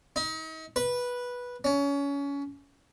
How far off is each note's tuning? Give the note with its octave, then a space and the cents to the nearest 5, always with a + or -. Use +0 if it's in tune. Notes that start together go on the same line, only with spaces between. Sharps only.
D#4 +40
B4 -10
C#4 +25